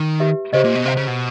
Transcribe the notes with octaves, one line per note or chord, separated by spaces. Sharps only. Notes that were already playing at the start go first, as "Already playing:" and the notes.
Already playing: D#3
G4 B4 E5
C#3 G4 C5 D#5
A#2
B2
C3 C5 F5 A#5
C#3
B2